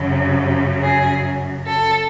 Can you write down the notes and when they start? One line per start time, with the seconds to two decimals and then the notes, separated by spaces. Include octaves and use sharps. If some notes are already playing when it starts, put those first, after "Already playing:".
Already playing: F#2 C#3 F#3
0.83 G#4
1.67 A4